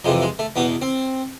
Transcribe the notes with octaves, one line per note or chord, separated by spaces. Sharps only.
F2 C3 E3 G#3
G#3
A3
E2 B2 B3
C4